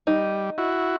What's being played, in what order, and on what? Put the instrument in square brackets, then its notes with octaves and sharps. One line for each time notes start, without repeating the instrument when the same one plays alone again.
[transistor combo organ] G3 [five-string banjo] D#4
[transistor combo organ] E4 F#4